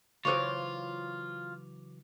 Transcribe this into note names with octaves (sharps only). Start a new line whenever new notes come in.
C#3 E3 F#3 F4 C5 C#6 D6 F7